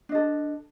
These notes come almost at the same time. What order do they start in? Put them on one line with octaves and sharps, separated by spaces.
D4 D#5 A4